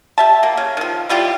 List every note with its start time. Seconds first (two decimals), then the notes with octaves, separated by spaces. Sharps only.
0.18 G4 E5 A5
0.43 A#3
0.57 C#3
0.77 D#3 F3
1.09 E3 G3 F4 G4